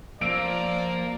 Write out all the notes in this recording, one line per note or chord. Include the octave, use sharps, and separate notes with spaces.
F3 A#3 D5 E6 D7 F7